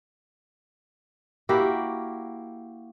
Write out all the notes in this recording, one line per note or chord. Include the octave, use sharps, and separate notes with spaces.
A#3 E4 F#4 G4